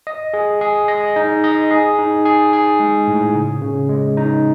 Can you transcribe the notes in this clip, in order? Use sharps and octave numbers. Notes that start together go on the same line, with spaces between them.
D#5
G#4
G#4
D#5
D#4
D#5
G#4
D#4
G#4
G#4
G#3
A2
C#3
C#3
G#3
D#4